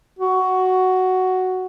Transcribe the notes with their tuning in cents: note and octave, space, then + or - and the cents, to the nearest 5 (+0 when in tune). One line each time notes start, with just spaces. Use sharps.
F#4 +5